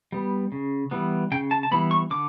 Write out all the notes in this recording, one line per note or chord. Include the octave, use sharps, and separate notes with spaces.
G3 B3
C#3
E3 G3 B3
C#3 G5
A5
A5
E3 G3 B3 B5
C#6
D3 D6